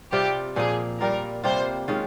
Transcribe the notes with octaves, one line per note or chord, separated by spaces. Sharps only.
C3 G3 C4 F4 G4
A#2 F3 A#3 G#4
A#2 G3 A#3 F4 A#4
C3 G3 A#3 F4 C5
D#3 G#3 C#4 F4